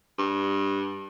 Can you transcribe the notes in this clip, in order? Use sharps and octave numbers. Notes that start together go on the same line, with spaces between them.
G2